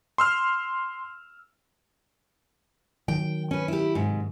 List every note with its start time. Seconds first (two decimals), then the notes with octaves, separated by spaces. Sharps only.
0.18 C6 E6 F6
3.08 D#3 F#3 G5
3.51 C#4 B4
3.68 E4 G4
3.95 G#2 C3